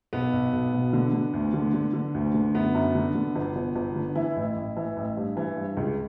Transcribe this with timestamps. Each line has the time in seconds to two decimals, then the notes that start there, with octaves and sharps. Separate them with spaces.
0.13 B1 B3
0.33 B1
0.53 B1
0.73 B2
0.93 D3
1.13 D3
1.33 D2
1.54 D3
1.74 D3
1.94 D3
2.14 D2
2.34 D3
2.54 F#2 B3
2.75 F#2
2.95 D3
3.15 D3
3.36 G1
3.56 G1
3.76 G1
3.96 D3
4.15 E3 E4
4.36 A1
4.56 A1
4.77 E3
4.97 A1
5.17 G2
5.37 E3
5.57 G2
5.77 C#2